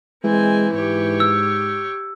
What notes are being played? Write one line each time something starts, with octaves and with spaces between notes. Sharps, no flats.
E3 G#3 C4 G#5
G#2 G4 C#5
E6